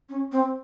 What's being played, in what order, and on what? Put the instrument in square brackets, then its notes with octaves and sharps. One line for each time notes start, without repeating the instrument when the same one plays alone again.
[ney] C#4
C4